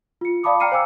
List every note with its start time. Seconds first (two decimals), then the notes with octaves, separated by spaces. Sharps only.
0.21 F4 C#7
0.43 D5 F5 A5 B5 D6 D#6
0.60 G5 A#5 F6 C7 C#7 D#7
0.72 C5 F5 G#5 D6 E6